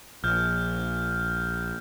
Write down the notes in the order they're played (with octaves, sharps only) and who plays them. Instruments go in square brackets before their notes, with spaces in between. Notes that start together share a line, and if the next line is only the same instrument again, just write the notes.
[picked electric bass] A#1 [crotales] F6 G6